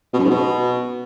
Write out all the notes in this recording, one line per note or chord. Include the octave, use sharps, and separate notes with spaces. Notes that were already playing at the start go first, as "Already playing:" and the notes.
B2
F#2
G#2
B2